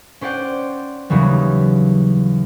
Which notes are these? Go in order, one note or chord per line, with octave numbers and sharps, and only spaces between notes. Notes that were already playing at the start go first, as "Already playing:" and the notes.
C#4 C5 D5 F#5 G5
D#2 C#3 E3 F#3 G3